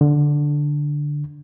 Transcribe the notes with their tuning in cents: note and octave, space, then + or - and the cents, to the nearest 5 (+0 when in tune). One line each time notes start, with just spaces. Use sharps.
D3 +0